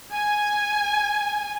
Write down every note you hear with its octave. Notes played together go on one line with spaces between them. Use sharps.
G#5